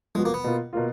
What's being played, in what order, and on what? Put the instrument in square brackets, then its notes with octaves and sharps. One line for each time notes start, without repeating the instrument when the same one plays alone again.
[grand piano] F3 B3 F#4 [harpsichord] G#3
[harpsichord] A#3
B3
[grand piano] B2 A#3 F4
B2 A#3 F4